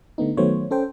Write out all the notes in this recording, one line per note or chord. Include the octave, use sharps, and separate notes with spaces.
D3 A3 B3 D#4
D#3 F#3 A3 B3 C5 C#5
C#4 A4 C5 G5